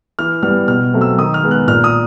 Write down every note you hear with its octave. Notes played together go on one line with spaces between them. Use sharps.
E3 F6
G3 B3 F6
B2 F6
F#3 A3 C4
E6
D#3 D#6
F6
G#3 B3
F#6
A#2 F6
D#6